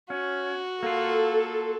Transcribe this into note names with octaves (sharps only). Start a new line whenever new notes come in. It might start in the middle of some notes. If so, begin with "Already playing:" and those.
C#4 F#4
A#3 F4 A4